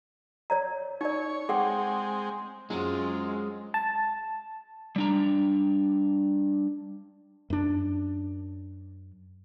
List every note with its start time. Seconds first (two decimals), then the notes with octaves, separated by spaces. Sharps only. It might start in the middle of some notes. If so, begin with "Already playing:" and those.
0.50 C#5 D5 A#5
1.01 D#4 C#5 D5
1.49 G#3 C4 G#4 F#5 G5
2.70 F#2 G#3 C4 F4
3.74 A5
4.96 G3 D4 A#5
7.50 F#2 D4